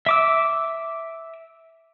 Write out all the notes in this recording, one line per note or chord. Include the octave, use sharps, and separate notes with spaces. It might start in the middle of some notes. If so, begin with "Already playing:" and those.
E5 D6 E6